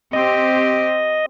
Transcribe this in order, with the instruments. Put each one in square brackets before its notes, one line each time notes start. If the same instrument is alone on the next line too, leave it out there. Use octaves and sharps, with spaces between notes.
[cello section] C4 G4 [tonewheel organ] D#5